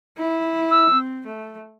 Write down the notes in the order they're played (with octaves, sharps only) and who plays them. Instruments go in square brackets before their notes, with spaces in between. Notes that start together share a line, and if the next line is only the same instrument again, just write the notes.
[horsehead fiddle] E4
[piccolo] E6
[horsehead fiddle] C4
A3